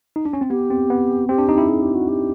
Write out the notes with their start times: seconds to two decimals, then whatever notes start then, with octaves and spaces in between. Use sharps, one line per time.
0.16 D#4
0.25 D4
0.33 C#4
0.41 C4
0.50 B3 G4
0.70 C4
0.90 B3
1.29 C4 G4
1.38 D4
1.49 D#4
1.58 E4
1.68 G#4
1.82 G4
1.95 F#4
2.09 G4